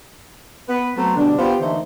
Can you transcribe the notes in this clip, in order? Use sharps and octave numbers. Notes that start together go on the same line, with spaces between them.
B3 B4
F#3 A3 B3 C4
B2 D3 G3 D4
B3 F4 G4 B4 C5
D3 E3 A3 A#3 D#4 C5